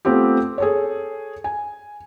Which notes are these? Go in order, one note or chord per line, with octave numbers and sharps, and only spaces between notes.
A3 B3 C4 F4 G4
G#4 A4 C#5
G#5